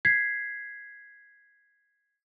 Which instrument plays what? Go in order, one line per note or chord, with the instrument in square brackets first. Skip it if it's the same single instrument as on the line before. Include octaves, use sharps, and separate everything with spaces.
[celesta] G#6 B6 C7